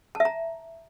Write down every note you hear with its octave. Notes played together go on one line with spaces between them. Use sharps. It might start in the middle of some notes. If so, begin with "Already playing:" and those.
A5
E5
A#5